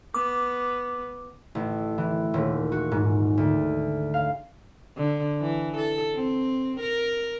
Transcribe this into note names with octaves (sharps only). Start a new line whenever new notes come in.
B3 D6
A1
E3
D#1
F#4
G#2
D2
F5
D3
E3
A4
C4
A#4